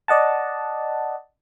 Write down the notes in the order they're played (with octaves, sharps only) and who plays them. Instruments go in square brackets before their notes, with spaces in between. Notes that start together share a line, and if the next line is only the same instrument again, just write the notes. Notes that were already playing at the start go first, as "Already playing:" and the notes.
[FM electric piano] D5 D#5 F#5 A5